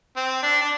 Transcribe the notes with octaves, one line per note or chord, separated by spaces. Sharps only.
C4
D4
D4